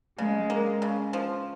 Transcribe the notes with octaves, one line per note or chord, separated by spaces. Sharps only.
C#3 G#3
A#3
C#3
F3